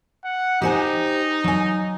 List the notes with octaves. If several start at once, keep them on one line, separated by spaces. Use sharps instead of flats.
F#5
D#4 G4 C5 G#5
F#3 G#5